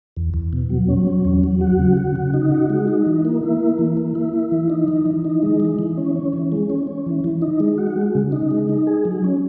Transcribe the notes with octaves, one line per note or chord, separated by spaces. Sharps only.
E2
E2
B2
F#3
C#4
F#3
E2
F#3
F#4
C#3
F#4
C#3
D#4
F#4
G#3
D#4
E3
A#3
E4
A#3
E3
A#3
E4
E4
E3
D#4
E3
E3
D#4
G#3
E3
E3
C#4
C#4
E3
G#3
C#4
C#4
E3
E3
D#4
G#3
F#4
G#3
C#3
D#4
G#3
D#4
G#4
F#3
C#4